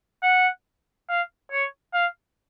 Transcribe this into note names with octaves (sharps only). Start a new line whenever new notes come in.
F#5
F5
C#5
F5